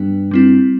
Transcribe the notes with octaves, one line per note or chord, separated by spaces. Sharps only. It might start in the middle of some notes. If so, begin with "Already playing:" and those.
Already playing: G2 B3 B4
G3 C4 E4